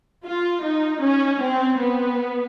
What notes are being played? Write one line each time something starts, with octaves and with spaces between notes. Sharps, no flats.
F4
D#4
C#4
C4
B3